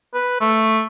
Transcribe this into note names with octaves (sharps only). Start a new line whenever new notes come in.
B4
A3